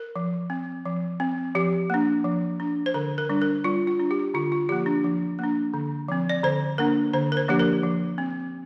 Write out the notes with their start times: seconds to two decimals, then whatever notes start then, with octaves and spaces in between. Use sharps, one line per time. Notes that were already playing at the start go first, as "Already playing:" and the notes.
Already playing: A#4
0.16 F3
0.50 C4
0.85 F3
1.20 C4
1.55 F3 G4
1.90 A#3 D4
2.24 F3
2.60 D4
2.86 C5
2.94 D3 A#4
3.18 A#4
3.29 G3 D4
3.42 A#4
3.64 G3 F4
3.87 F4
4.00 D4
4.11 G4
4.34 D3 F4
4.52 F4
4.69 F3 A#3 G4
4.86 D4
5.04 F3
5.39 A#3 D4
5.74 D3
6.08 F3 C4
6.30 D5
6.44 D3 C5
6.78 A#3 D4 A#4
7.13 D3 C5
7.32 A#4
7.37 C5
7.48 F3 A#3 D4 G4
7.59 A#4
7.83 F3
8.18 C4